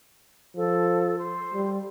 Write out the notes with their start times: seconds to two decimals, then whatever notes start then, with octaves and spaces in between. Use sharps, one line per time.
0.57 F3 A4
1.18 C5
1.54 G3